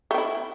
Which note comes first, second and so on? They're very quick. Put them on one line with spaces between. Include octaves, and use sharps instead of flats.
A3 C4 E4